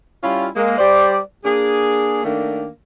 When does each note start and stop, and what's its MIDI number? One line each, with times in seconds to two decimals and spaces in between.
0.24 0.47 55
0.24 0.47 61
0.24 0.47 64
0.24 0.47 65
0.56 0.76 56
0.56 0.76 58
0.78 1.19 55
0.78 1.19 72
0.78 1.19 74
1.45 2.20 58
1.45 2.20 62
1.45 2.20 68
2.24 2.67 51
2.24 2.67 57
2.24 2.67 58
2.24 2.67 62